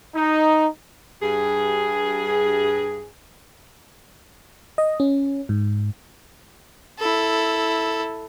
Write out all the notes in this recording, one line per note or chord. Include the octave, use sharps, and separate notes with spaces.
D#4
G2 G#4
D#5
C#4
G#2
E4 A4